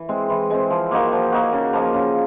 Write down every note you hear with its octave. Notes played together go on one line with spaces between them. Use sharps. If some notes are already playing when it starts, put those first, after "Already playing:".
Already playing: E3
G#3 C4
E3
G#3 C4
F3
A#3 D#4 F#4
F3
A#3 D#4 F#4
C#3
F3 A#3 D#4
C#3